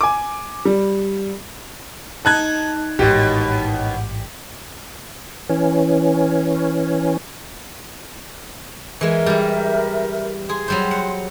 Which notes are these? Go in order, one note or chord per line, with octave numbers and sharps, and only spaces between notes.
G#5 D6
G3
D#4 A5 F#6 G#6
A1 D#2 G#2 B2 G4
E3 C#4
E3 G#3 A#4 E5
G3 E4
G#4 C6
F#3 G3 C5
F#5